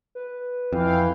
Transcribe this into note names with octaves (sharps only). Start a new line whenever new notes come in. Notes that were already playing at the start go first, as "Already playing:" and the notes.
B4
F2 E3 F5 G5